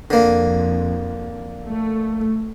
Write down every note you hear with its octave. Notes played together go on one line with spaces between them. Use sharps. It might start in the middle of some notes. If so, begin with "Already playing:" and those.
F2 D3 A#3
A3